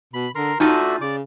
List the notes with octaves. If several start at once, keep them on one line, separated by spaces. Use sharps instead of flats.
B2 B5
D3 A#4 A#5 C6
A3 D4 D#4 F4 F#4 E5 G#5
C#3 D5 D6